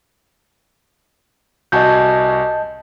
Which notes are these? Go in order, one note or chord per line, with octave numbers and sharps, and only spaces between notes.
C2 F#4 D#5 G#5 A5 G6